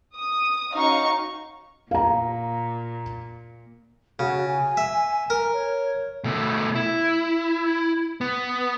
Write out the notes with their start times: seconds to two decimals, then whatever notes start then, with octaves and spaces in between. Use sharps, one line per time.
0.15 D#6
0.73 C#4 D#4 F#4 F5 C#6
1.91 A#2 F5 A#5
4.19 C#3 F#4
4.48 G#5
4.77 E5
5.30 A#4
5.53 C#5
6.24 B2 A3
6.75 E4
8.21 B3